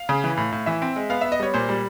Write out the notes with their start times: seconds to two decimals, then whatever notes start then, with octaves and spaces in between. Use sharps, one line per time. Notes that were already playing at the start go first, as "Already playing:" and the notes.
Already playing: F5
0.09 C#3
0.24 E3
0.37 A2
0.52 A2
0.66 E3 E5
0.82 C4
0.96 G#3
1.10 B3 F5
1.21 B3 E5
1.32 D#5
1.40 G3 C#5
1.54 A#2 C5
1.69 G3